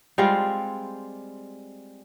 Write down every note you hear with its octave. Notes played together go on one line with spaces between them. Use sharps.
G3 G#3 C4 F4